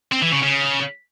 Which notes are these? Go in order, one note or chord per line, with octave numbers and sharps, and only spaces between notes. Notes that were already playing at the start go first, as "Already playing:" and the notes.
C4
E3
C#3
C#3